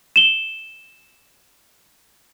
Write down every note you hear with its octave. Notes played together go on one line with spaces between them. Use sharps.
E7 G7